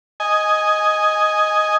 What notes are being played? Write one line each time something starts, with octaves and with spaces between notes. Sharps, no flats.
D#5 G#5